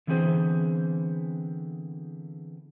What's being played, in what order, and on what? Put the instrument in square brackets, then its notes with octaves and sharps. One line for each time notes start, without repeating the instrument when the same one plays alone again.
[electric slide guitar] D3 E3 B3 C4 G#4 C5